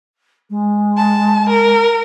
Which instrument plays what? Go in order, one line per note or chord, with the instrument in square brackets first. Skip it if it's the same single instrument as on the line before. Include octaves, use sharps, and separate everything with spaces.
[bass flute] G#3
[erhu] A5
A#4